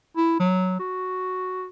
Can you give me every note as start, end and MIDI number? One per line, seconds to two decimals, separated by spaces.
0.17 0.36 64
0.40 0.78 54
0.79 1.68 66